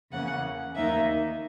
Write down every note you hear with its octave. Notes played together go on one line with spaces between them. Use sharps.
E2 C#3 E3 A#3 C#4 F#5
D#2 D#3 A#3 D#4 E5